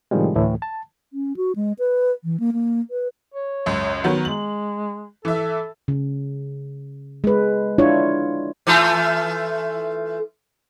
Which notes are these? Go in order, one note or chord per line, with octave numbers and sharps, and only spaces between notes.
A2 C3 D#3 F3 G3 G#3
D2 A2 E3
A5
C#4
F#4
G#3
B4
E3
A#3
A#3
B4
C#5
C#2 F#2
D#3 F#3 B3
G#3 F#7
E3 A4 E5
C#3
G#3 B4
D4 E4 F4 C#5
E3 A3 F4